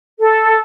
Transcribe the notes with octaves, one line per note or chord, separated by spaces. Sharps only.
A4